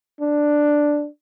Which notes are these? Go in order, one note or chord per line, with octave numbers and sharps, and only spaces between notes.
D4